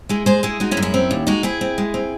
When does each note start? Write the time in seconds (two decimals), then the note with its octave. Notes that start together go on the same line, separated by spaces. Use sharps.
0.09 G#3 E4 G#4
0.26 G#3 G#4 C5
0.43 G#3 E4 G#4
0.60 G#3 D#4 F#4
0.71 C#4 E4
0.77 F#2
0.82 C#4 E4
0.94 C4
1.11 D#2
1.27 G#3 D#4 F#4
1.43 C4 E4 G#4
1.61 C4
1.78 G#3
1.94 C4